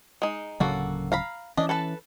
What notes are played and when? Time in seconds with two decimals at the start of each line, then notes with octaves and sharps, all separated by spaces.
0.22 G#3 D#4
0.60 D1 C#3 F#3 A#3 F#4 A4
1.12 F5 A#5 B5
1.57 E3 C#4 D4 D#5
1.69 A4 B4 A5